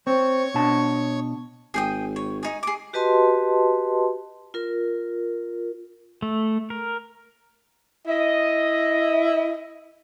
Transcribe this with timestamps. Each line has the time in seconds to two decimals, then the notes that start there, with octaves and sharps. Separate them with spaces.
0.07 C4 C#5 C#6
0.54 B2 D4 A5
1.74 G#1 G#4 G5 D#6
2.16 C#5
2.43 D#4 G#4
2.63 G#4 D6
2.93 F#4 G4 B4 D#5 A5 C6
4.54 F4 A#4
6.22 A3
6.70 A#4
8.07 E4 D#5